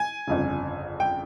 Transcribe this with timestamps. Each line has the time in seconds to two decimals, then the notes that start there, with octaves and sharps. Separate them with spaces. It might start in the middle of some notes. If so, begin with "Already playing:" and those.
Already playing: G#5
0.27 G1 F2 C#3
1.00 G5